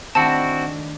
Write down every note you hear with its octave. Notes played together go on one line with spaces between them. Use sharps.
D#3 A3 C4 D4 E4 F#4 A5